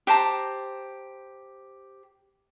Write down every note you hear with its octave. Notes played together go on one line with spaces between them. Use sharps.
G4 C5 A5 A#5